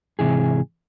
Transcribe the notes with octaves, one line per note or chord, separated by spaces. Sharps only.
G#2 C3 E3 G#4